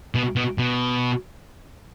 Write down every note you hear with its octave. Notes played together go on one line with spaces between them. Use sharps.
B2
B2
B2